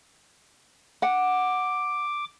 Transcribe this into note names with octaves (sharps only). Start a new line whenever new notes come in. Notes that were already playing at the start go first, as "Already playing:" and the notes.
F#5 D6